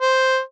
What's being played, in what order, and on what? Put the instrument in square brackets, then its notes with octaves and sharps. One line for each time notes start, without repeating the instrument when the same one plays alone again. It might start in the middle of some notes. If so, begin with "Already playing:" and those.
[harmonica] C5